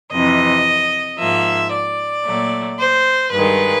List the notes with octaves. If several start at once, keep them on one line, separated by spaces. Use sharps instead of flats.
F2 C3 E3 D#5
G#2 F3 A#3 E5
D5
A#2 F#3 A3
C5
G2 D#3 G#3 B4